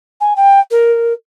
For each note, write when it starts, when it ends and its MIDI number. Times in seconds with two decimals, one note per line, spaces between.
0.21 0.34 80
0.36 0.60 79
0.71 1.13 70